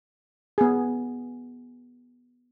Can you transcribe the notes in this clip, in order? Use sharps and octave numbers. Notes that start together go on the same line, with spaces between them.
B3 G#4